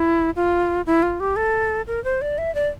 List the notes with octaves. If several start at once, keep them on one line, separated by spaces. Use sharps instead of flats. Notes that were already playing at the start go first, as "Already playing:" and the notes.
Already playing: E4
F4
E4
F4
G4
A4
A#4
C5
D5
E5
D5